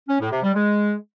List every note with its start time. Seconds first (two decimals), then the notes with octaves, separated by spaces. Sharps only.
0.08 C#4
0.19 A2
0.31 C3
0.43 G3
0.54 G#3